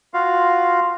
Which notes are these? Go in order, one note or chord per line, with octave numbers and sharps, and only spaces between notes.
F4 F#4 F5